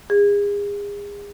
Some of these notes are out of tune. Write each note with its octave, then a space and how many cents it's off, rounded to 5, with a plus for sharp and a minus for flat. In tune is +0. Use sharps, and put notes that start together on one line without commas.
G#4 -35